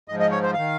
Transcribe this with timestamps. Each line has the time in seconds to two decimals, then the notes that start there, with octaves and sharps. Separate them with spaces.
0.08 G#2 F3 D#5
0.20 D#5
0.31 C#5
0.43 C5
0.54 D#3 F5